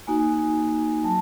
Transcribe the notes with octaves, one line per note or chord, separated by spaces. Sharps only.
A#3 D#4 F#4 G#5
F#3 A5